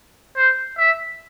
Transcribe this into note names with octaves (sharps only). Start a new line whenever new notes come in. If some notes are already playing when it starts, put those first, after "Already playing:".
C5
E5